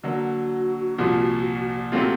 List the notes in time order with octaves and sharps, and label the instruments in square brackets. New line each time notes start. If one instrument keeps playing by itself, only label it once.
[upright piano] D3 F#3 A#3 [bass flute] F#4
[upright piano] C2 A#2 F3
[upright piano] A#2 F#3 A3 C4 F4 [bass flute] G4